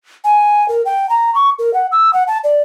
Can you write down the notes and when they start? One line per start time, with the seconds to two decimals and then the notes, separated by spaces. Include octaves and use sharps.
0.24 G#5
0.69 A#4
0.85 G5
1.10 A#5
1.35 C#6
1.59 A#4
1.74 F#5
1.92 E6
2.13 F#5
2.27 A5
2.44 D5